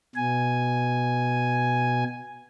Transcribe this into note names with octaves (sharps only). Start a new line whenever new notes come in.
B2 G#5